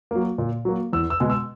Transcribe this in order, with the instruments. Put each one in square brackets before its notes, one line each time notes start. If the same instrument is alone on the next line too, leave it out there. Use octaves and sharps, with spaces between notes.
[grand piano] F#3 A#3
A#2
F#3 A#3
E2 E6
E6
B2 G#3 B3
E6